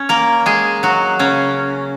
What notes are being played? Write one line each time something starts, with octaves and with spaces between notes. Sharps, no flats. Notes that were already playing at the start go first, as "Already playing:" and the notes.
Already playing: C#4 C#5
A#3 A#4
G#3 G#4
F#3 F#4
C#3 C#4